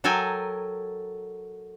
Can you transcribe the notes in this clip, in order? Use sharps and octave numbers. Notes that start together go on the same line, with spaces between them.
F#3 A4 A#4 G5 G#5